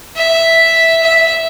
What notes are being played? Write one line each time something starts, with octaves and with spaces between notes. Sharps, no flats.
E5
E5